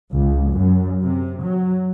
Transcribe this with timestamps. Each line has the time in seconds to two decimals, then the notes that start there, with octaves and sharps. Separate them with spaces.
0.11 C#2
0.52 F#2
1.02 C3
1.42 F#3